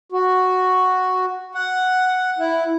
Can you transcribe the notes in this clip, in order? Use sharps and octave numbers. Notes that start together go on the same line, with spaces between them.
F#4
F#5
E4